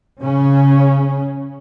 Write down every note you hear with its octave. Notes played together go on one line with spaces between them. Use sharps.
C#3 C#4